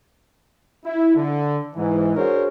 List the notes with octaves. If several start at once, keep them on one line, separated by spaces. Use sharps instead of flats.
E4
D3
G#2 E3
D4 F#4 G#4 A#4 C5 C#5